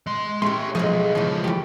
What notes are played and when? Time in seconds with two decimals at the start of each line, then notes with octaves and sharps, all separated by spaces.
0.07 G#3 C6
0.42 A3 C#4 G4 G#4 C6
0.75 B1 F3 G#3 D#4 G#4
1.15 C#3 E3 F3 A3
1.44 E3 G4